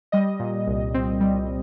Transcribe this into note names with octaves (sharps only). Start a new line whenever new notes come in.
G3 D#5
A#2
C2
C4
G3